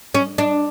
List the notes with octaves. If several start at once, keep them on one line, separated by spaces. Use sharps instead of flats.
C#4
D4